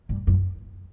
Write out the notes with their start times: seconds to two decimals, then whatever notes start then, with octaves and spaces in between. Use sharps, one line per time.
0.09 G2
0.27 F#2